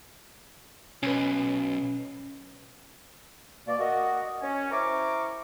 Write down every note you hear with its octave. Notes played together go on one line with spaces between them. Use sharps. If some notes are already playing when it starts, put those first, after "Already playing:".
B1 C#4 B4
B2 A#3 D5
F#4 A#4 D#5
C#4
E4 A#4 C5 A#5 C#6 D6